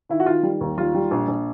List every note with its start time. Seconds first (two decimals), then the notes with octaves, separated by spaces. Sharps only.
0.09 D#3 E4
0.20 F#4
0.26 D#3 F4
0.43 G3
0.61 D#2
0.78 G3 F4
0.94 G3
1.11 A#1
1.28 A#1